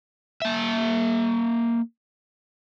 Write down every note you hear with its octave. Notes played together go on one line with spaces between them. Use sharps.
A#3 E5